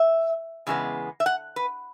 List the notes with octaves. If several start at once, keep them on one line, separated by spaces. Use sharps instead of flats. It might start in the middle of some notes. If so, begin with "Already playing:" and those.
Already playing: E5
E2 C#3 G#3 B3
E5
F#5
B4